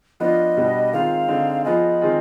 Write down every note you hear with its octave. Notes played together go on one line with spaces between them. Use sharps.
F3 B3 D4 F4 D#5
B2 G3 B3 D4
D#3 G#3 C4 F4 F5
D3 G#3 C4 D#4
F3 B3 F4 G#4 D#5
D#3 G#3 C4 F4 G#4